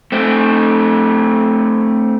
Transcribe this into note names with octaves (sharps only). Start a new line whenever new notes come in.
A3 C4